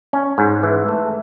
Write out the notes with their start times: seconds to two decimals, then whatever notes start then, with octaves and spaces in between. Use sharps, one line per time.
0.13 C#4
0.38 G#2
0.63 E3
0.89 A3